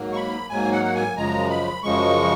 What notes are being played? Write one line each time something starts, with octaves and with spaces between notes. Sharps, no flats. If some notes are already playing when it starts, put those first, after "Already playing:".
Already playing: G#2 F#3 A#3
C#6
B5
G#2 F#3 A#3 G#5
F#5
F#5
G#5
F#2 C#3 F3 G#3 A#5
B5
F#2 C#3 F3 G#3 C#6